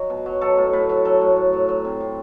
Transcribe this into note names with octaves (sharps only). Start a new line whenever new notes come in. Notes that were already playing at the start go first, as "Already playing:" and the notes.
Already playing: F#3 D#4 F#4
B2
F#3
F#3 A4
A2
A2 B4
F#3
F#3 A4
A2
A2
F#3
F#3
C3
C3